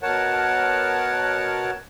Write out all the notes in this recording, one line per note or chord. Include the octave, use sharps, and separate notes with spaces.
B2 A#4 C#5 F#5 A5